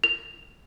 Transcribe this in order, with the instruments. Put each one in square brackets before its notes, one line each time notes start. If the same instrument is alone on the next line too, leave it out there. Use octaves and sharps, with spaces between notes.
[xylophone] F7